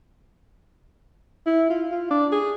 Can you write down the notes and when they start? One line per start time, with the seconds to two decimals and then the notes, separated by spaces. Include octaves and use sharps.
1.46 E4
1.70 F4
1.91 F4
2.11 D4
2.32 G#4